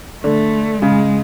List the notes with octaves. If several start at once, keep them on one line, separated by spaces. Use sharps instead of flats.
D3 A3
C#3 G#3